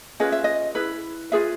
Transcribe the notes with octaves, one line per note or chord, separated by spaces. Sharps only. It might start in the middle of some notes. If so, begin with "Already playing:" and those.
C#4 F4 G#4 B4 D#5
E5
D#5
E4 G#4 B4
F4 G#4 B4 E5